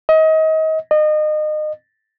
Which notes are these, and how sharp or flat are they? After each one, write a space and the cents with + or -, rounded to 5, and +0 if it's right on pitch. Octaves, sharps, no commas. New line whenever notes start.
D#5 +30
D#5 -30